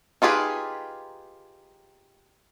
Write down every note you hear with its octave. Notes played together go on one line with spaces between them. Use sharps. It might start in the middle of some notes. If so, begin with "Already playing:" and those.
D#4 F4 G4 G#4 B4